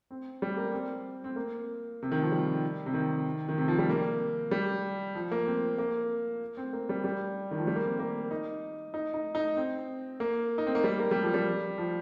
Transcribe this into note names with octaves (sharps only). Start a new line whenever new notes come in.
C4
G3
A#3
C4
C4
A#3
C3
D#3
F3
G3
C3
D#3
D#3
C3
F3
G3
A#3
G3
F3
A#3
C4
A#3
C4
A#3
G3
G3
D#3
F3
G3
A#3
C4
A#3
D#4
D#4
D#4
D#4
C4
A#3
D#4
C4
A#3
G3
A#3
G3
F3
G3
F3